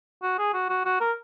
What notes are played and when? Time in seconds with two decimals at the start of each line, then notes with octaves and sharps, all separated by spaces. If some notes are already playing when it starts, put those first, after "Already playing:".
0.23 F#4
0.39 G#4
0.54 F#4
0.69 F#4
0.85 F#4
1.01 A#4